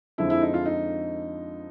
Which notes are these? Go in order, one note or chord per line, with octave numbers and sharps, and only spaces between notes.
F2 D3 F3 G#3 E4
E4
D#4
F4
D#4